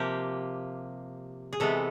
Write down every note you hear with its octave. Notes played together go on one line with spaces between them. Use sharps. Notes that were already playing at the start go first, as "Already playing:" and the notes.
Already playing: C3 F3 A#3 G4
G#4
C3 E3 G#3 B3 A4